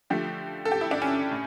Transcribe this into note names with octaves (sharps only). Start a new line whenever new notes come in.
D3 F3 A3 G4
A4
G4
E4
D4
C#4
A2